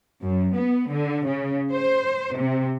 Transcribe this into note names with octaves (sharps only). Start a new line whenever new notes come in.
F#2
B3
D3
C#3
C5
C3